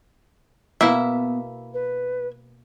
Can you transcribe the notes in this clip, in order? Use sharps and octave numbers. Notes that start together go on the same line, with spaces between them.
B2 A#3 B3 E4 E5
B4